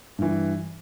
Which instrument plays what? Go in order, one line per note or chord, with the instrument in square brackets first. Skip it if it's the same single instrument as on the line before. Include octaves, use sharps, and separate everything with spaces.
[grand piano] G2 E3